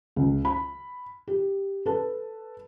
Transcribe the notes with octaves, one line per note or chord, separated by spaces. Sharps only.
C#2
B5
G4
A4 B4 A5